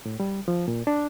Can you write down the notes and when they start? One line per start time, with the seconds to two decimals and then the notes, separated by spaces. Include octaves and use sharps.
0.06 A2
0.20 G3
0.48 F3
0.68 A#2
0.87 D4